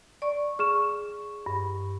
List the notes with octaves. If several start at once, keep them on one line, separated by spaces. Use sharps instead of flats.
D5 C#6
G#4 C#6 F6 E7
G2